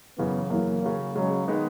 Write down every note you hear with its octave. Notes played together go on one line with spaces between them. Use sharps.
F#2 C#3 E3 B3
F#2 C#3 E3 A#3
C#3 F#3 C#4
C#3 F#3 G#3 C#4
D#3 G#3 B3 D#4